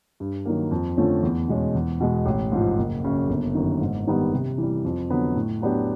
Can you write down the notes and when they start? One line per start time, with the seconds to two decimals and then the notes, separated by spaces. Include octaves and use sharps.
0.20 G2
0.45 D#3 F#3 A#3
0.71 F2
0.97 D3 F3 A3 C#4
1.23 E2
1.48 B2 G#3 C#4
1.75 E2
2.00 B2 G#3
2.26 A1
2.52 G#2 F3
2.78 F#1
3.04 F#2 C#3
3.29 G1
3.55 F#2 D#3
3.81 G#2
4.07 D#3 G3 B3
4.33 C3
4.58 E3 G3
4.85 F2
5.10 D3 F#3 B3
5.36 A2
5.62 F#3 B3 D4 G4